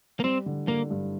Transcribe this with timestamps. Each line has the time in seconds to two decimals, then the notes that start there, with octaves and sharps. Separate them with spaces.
0.20 A#3
0.24 G3 C4
0.46 D3
0.68 D3 A#3
0.90 G2